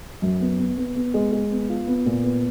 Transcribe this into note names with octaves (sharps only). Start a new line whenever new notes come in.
F#2
B3
B3
B3
B3
G#3
G#3
B3
F4
B3
A#2
B3